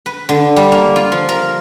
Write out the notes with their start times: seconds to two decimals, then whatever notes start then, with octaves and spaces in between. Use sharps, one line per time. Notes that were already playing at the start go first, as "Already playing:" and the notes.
0.06 B4
0.29 D3
0.56 G3
0.72 A#3
0.96 F4
1.12 F3
1.29 A#4